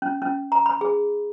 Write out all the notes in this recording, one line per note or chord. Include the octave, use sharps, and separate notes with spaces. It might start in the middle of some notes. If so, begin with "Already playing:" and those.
C#4
C#4
A#5
B5
G#4